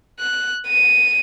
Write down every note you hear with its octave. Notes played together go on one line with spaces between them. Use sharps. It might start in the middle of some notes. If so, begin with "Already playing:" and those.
F#6
D#7